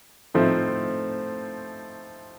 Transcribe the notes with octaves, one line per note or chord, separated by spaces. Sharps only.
A2 F3 A3 C4 D#4